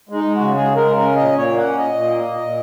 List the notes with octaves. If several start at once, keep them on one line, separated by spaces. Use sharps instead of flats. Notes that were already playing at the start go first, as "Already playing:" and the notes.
G#3 D#4
G#3
F#4
C#3
G#3 G#4
G#3
A#4
C#3
A#4
C#4
A#2 D#5
A#2
C#5
A#3
F#5
C#4
A#2 D#5
A#2
A#3
A#2
A#2